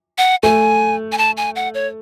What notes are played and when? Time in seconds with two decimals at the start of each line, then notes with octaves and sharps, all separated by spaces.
0.18 F#5
0.43 A3 G#5
1.12 G#5
1.18 A5
1.37 G#5
1.56 F#5
1.74 C#5